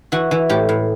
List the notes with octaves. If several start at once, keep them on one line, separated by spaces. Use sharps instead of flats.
E3 F#4
E3
A2 G4
A2